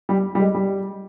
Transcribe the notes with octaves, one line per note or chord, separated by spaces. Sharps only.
G3
G3
G#3
G3